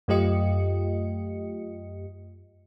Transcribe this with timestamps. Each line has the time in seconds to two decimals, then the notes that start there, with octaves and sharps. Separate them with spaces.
0.08 F#2 A3 F4 G4 D#5 C#7